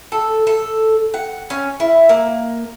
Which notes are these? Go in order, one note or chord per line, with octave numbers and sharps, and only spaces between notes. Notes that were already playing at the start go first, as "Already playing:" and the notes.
A4
A4
F#5
C#4
E4
A#3